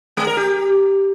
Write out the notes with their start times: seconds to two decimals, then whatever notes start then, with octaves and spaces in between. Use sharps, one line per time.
0.17 G#3
0.27 A#4
0.37 G4